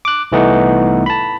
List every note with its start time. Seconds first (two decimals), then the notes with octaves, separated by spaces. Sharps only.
0.05 D6 F#6
0.32 C2 E3 A3 B3 D#4 F#5
1.06 A5 B5